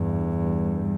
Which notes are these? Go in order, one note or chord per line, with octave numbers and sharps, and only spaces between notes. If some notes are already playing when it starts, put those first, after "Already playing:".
Already playing: E2 G2
G2